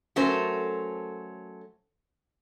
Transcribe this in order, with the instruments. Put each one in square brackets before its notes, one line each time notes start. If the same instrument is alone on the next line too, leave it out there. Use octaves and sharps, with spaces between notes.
[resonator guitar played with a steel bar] F#3 A3 C#4 A4 A#4 C5